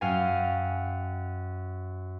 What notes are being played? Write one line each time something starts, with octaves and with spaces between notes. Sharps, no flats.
F#2 F5 G5 G#5